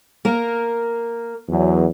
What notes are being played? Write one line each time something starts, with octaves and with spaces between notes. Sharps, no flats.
A#3 A#4
E2 F#3